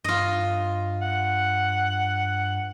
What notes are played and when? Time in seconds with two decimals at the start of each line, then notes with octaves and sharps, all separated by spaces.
0.04 G2 F4 D#5
1.01 F#5